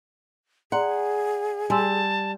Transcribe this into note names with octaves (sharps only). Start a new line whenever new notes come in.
G#4 D5 F#5 A#5 C6
G3 G#5 A5 C6 E6